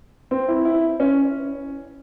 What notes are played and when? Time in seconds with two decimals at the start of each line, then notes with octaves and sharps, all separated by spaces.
0.31 C4
0.48 E4
0.65 E4
1.00 C#4